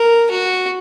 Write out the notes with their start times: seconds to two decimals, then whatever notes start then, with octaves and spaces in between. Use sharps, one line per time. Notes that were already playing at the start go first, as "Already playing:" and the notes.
Already playing: A#4
0.31 F#4